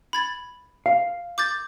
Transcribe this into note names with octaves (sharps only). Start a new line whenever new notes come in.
B5 G#6 A6
F5
D6 G6 A6